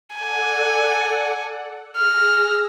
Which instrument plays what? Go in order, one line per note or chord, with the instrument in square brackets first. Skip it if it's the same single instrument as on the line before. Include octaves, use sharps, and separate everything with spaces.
[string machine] A4 D5 F#5 [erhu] G#5
[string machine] G#4 E6 A#6 [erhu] F6